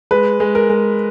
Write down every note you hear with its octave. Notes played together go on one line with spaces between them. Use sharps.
G#3 B4
G#3
A#4
G#3